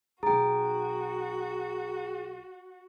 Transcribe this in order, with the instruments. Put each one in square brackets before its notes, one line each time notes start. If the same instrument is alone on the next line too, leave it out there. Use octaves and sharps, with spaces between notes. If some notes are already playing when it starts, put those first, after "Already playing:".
[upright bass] B1 D#4 [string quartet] F#4 [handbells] G#4 G5 [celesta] A#5